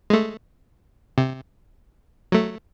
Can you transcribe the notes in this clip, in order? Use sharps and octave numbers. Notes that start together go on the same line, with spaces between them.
G#3 A3
C3
F#3 A3